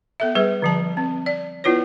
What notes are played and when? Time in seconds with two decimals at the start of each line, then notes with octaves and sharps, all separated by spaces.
0.20 B3 A4 E5
0.35 G3 G#4 B4
0.62 D3 F3 A5
0.97 C4
1.26 D5
1.64 B3 E4 F4 B4 C#5